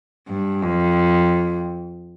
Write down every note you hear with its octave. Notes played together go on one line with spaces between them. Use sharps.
G2
F2